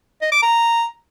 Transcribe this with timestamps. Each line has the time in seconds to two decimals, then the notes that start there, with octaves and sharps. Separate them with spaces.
0.22 D#5
0.32 D6
0.43 A#5